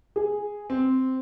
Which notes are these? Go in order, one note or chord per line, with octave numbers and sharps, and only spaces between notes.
G#4
C4